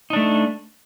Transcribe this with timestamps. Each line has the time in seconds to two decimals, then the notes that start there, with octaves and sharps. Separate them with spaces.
0.10 D#4
0.13 D4
0.16 A3